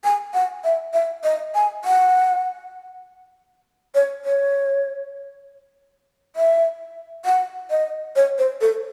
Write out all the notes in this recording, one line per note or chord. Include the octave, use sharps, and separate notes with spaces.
G#5
F#5
E5
E5
D#5
G#5
F#5
C#5
C#5
E5
F#5
D#5
C#5
C5
A4